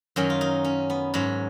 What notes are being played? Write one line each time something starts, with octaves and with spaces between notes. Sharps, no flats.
F#2 D#3 F#3 C#4
F4
D#4
C#4
B3
G#2 F#3 C#4